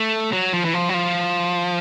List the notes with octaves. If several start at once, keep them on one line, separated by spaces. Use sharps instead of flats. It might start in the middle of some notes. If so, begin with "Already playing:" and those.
Already playing: A3
F#3
F3
E3
F3
F#3
F3